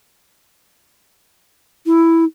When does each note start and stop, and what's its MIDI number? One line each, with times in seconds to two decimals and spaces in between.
1.86 2.24 64